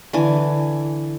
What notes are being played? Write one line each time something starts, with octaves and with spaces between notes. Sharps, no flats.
D3 E3 G#5